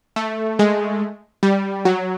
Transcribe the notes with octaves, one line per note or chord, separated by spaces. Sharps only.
A3
G#3
G3
F#3